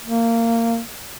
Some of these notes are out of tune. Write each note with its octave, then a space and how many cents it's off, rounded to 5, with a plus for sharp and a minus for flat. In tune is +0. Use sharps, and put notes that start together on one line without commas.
A#3 -20